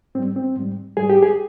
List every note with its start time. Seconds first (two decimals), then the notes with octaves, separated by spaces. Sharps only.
0.15 G#2 C4
0.19 G3
0.36 C4
0.56 G#2 G3
0.97 G#2 G3 G#4
1.10 G4
1.22 G#4